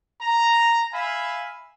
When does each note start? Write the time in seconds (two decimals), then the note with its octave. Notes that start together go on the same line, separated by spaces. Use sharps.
0.21 A#5
0.93 E5 F5 G#5 B5